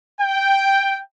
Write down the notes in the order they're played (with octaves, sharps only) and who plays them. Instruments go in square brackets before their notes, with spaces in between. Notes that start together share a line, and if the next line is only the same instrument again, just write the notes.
[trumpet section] G5